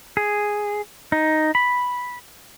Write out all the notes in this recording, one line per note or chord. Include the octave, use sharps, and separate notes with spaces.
G#4
D#4
B5